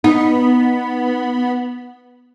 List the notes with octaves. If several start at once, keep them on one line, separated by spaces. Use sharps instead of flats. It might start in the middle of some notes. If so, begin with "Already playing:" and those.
B3 D#4